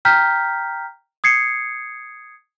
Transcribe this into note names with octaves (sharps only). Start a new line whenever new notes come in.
G5 A#5 F6 G6 B6
D#6 G#6 C7 C#7